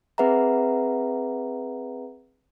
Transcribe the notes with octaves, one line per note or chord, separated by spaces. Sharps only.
C4 G#4 B4 E5 F#5 A#5